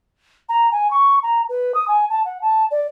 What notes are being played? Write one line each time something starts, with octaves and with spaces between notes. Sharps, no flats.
A#5
G#5
C#6
A#5
B4
D#6
G#5
A5
F#5
A5
D5